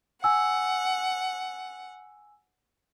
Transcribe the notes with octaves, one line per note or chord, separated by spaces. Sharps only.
F#5 G#5 E6